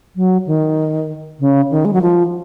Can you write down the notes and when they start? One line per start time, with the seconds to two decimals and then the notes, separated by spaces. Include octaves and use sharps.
0.16 F#3
0.47 D#3
1.40 C#3
1.71 D#3
1.85 G#3
1.93 F#3
2.02 F3